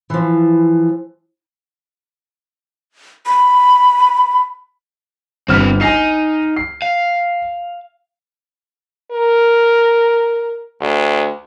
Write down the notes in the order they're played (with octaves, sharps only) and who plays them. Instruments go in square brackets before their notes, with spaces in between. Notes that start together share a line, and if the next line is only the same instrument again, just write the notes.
[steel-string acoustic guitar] E3 F3
[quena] B5
[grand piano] G1 F6 B6 [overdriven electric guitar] C4 B4
[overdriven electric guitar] D#4 [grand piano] G#5 A#6 C7
[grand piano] C7
[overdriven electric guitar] F5
[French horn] A#4
D2